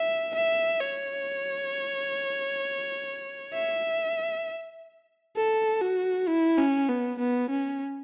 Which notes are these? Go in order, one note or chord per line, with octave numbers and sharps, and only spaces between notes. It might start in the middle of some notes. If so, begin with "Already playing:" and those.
Already playing: E5
E5
C#5
E5
A4
F#4
E4
C#4
B3
B3
C#4